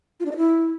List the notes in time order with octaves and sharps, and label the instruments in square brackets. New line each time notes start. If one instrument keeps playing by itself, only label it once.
[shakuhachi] F4
D4
D#5
E4